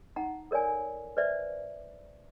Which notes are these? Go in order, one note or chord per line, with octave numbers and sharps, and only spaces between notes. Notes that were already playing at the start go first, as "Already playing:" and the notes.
D#4 F#5 A#5
A4 A#4 C#5 D5 G#5
B4 C5 D5 E5